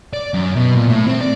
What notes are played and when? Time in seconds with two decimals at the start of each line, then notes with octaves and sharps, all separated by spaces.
0.14 D5
0.34 F#2
0.56 B2
0.76 A#2
0.88 A2
1.06 C4
1.21 D5